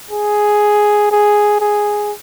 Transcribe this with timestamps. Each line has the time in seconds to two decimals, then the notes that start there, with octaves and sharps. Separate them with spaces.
0.11 G#4
1.11 G#4
1.60 G#4